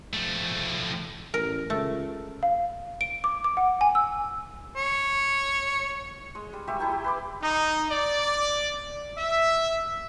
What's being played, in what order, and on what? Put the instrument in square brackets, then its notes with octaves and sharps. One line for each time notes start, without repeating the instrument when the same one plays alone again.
[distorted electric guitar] F3 A3
[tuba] A1 [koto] A#4
[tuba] C#2 [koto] A3
[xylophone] F5
D7
D6
D6
F#5
G#5
E6
[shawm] C#5
[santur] G#3
G3
G#3 F#4 G4 E5
E4 A4 G5 A#5
G4
B4 C6 D6
[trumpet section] D#4
D5
E5